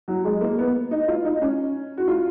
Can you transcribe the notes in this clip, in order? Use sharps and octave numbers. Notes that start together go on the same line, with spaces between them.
F#3
G#3
A#3
B3
D#4
F4
D#4
C#4
F#4
F4